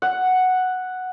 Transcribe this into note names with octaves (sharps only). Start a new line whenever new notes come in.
F#5